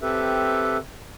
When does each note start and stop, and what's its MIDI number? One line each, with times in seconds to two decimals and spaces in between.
0.01 0.77 60
0.01 0.77 67
0.01 0.77 69
0.01 0.77 71
0.01 0.77 76